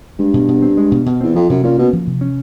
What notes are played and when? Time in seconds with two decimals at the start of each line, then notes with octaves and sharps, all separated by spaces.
0.19 G2 G#3
0.34 B2
0.48 B2
0.62 C4
0.77 G#3
0.92 B2
1.06 B2
1.21 E2 C4
1.34 F2 F3
1.49 F#2 C3
1.64 A#2 C#4
1.78 B2 A#3
1.93 F3
2.07 C3
2.21 C#4